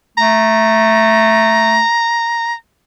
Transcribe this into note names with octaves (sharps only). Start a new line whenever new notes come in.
A3 A#5